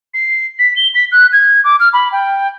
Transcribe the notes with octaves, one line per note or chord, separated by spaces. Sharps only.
C7
B6
G7
B6
F#6
G#6
D6
F6
B5
G5